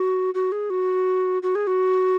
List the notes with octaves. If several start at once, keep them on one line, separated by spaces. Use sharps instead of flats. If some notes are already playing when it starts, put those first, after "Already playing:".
Already playing: F#4
F#4
G#4
F#4
F#4
G#4
F#4